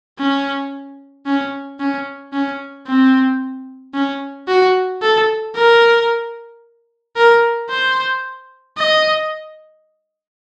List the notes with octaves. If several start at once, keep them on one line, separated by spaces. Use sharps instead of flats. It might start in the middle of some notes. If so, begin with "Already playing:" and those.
C#4
C#4
C#4
C#4
C4
C#4
F#4
A4
A#4
A#4
C5
D#5